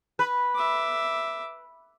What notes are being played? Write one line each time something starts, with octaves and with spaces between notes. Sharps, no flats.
B4
E5 D6